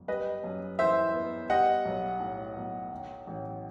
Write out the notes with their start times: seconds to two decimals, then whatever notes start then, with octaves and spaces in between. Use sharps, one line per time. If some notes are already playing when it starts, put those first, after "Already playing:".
Already playing: G1 F#2
0.08 G3 B4 D#5
0.44 F#2
0.79 E3 C5 E5
1.14 B3
1.49 G3 D#5 F#5
1.85 B1
2.20 A2
2.57 B1
2.92 D#3
3.27 A1